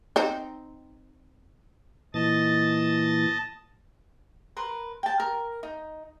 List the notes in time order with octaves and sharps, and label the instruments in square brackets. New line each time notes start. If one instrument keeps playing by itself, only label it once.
[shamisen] C4 D#4
[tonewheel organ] A#2 E3 A6 [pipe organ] D#5 A5
[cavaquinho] A#4 B4 C6
G5 A5
A#4
D#4